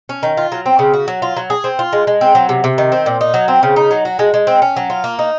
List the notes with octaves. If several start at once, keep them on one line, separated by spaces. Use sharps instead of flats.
C#4
D#3
F4
F#3
C4
C#3
F#4
F#3
F4
F#3
G#4
C4
F4
G#3
G#3
C4
F#3
C3
C3
D#3
C4
A#2
D#4
F#3
C4
C#3
D#4
F#3
F#4
G#3
G#3
C4
C#4
F#3
F4
A#3
D#4